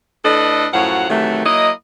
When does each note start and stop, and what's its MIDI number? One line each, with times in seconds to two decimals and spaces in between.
0.24 0.67 45
0.24 0.67 62
0.24 0.67 69
0.24 0.67 71
0.24 0.67 74
0.24 0.67 75
0.73 1.07 42
0.73 1.07 45
0.73 1.07 53
0.73 1.07 66
0.73 1.07 77
0.73 1.07 78
1.10 1.43 48
1.10 1.43 51
1.10 1.43 52
1.10 1.43 54
1.10 1.43 57
1.45 1.70 54
1.45 1.70 58
1.45 1.70 64
1.45 1.70 75